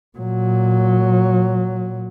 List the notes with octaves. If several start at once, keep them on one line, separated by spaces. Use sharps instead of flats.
A#2 F#3